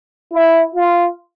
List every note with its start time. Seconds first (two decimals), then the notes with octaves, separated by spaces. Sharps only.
0.32 E4
0.74 F4